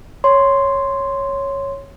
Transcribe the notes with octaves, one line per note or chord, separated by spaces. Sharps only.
C#5 C6